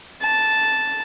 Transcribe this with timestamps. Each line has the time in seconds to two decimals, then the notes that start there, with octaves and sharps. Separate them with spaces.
0.22 A5